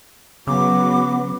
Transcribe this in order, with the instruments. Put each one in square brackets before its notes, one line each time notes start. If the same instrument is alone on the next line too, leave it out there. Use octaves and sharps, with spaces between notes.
[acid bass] C#3 [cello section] F#3 [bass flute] B3 [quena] D6